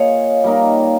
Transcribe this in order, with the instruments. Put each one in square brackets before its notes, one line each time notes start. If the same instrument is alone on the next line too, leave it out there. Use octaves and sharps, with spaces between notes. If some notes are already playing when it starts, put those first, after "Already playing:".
Already playing: [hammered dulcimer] A#3 F4 G#4 [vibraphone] C#5 D#5 F5
[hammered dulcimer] G3 A#3 D#4